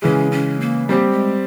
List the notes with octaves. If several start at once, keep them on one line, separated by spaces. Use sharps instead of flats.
C#3 E3 G#3 C#4
C#4
A#3
G3 A#3 C4 G4
G#3